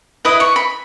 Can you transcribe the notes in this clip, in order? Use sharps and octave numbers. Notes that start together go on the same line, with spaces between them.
E4 B4 D#5 D#6
C#6
B5